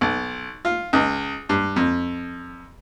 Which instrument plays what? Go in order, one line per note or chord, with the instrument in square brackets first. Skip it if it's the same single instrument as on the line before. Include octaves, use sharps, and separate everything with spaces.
[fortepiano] B1
F4
C#2
G2
F2